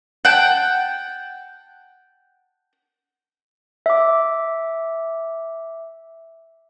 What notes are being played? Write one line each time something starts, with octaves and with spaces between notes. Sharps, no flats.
F#5 G5 A5
E5 D6